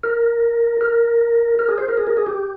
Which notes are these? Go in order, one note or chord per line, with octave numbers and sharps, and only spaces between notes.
A#4
A#4
A#4
G#4
C5
A#4
G#4
A#4
G#4
G4